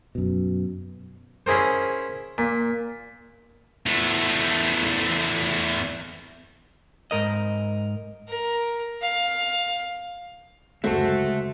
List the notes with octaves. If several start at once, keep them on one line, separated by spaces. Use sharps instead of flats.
F#2 B2
C#4 E4 G#4 A#4 C5
A#2
E2 A3
G#2 A#4 D#5
A#4
F5
F#1 D2 G#3 A3 F#4 C5 E5 A5